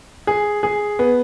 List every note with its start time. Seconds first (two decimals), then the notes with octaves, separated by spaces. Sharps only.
0.27 G#4
0.63 G#4
0.99 B3